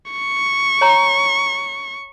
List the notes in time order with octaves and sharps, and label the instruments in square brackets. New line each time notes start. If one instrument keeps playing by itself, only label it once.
[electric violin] C#6
[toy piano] C#5 A#5